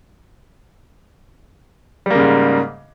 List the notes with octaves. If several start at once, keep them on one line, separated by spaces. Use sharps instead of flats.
G#2 C#3 G3 A#3